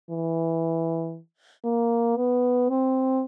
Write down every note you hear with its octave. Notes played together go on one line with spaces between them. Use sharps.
E3
A#3
B3
C4